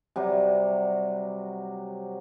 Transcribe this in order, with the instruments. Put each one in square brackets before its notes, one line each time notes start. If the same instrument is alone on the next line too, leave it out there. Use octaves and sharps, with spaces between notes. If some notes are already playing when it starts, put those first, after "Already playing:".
[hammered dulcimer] C3 F#3 G3